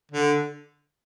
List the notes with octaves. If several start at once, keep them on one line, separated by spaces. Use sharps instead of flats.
D3